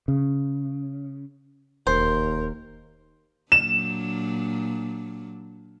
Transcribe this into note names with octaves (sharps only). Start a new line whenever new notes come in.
C#3
E1 D#2 A#4 C5
A#2 F#3 D4 E7